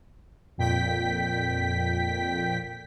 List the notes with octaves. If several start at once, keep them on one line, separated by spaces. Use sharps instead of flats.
F2 A#2 G5 B6